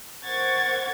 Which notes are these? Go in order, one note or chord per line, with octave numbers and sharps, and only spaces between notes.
A#4 C5 F#5 C#6 G#6 A6